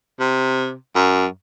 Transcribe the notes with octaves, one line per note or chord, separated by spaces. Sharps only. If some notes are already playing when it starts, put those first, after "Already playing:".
C3
F#2